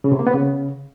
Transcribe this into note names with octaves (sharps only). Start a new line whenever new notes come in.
C#3
C3
A#3
B3
C#3